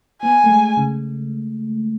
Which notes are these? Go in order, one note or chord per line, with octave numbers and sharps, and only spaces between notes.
B3 G#5
A3
G#3
C#3